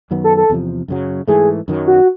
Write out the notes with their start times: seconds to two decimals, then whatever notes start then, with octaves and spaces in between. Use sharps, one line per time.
0.11 F#2 D#3 F#3 B3
0.24 A4
0.37 A4
0.50 E2 C3 F3
0.88 F#2 C#3 F#3
1.28 G#2 E3 A3 G#4
1.68 F#2 D#3 F#3
1.87 F#4